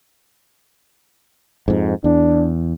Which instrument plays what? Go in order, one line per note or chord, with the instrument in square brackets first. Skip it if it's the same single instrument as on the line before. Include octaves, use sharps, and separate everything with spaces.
[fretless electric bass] F2 G#2
[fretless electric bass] E2 [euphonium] D4